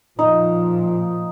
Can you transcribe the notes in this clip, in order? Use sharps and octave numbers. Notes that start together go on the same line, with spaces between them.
A#2 F3 D#4